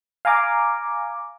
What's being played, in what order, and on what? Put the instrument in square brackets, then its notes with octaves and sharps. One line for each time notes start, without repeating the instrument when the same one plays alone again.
[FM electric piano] F5 G#5 A#5 D6